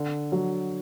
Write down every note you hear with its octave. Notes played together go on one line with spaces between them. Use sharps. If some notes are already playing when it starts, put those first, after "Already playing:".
Already playing: D3
F#3